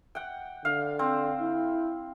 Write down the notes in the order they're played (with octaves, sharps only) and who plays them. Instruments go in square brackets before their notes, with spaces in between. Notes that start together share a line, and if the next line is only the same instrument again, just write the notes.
[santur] F#5 G5
[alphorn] D3 [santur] F5
[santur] C4
[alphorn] E4